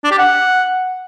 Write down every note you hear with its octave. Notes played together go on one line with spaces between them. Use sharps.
D4
G4
F#5